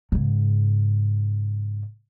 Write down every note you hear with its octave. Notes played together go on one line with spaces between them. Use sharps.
G#2 C#3